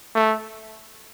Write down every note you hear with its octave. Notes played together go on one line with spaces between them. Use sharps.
A3